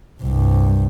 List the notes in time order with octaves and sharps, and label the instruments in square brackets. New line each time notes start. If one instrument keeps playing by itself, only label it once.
[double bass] C2 G2